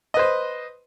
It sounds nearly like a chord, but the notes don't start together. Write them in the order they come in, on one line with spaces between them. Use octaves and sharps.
D#5 B4 C5